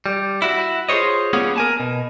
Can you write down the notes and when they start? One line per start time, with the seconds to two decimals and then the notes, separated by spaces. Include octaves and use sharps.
0.06 G3
0.42 E4 F#4
0.89 F4 G#4 C5 C#5 D#5
1.33 G3 A#3 B3 C#4 G#4 C#5
1.56 A#4 G#5 A5
1.80 B2